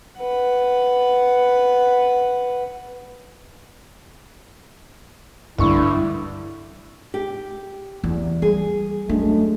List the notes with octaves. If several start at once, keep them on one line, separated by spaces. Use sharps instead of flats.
B4 F#5
G2 D3 E3 G3 E4 C#6
G4
E2
G3 G#4
F#2 G#3 A3 D4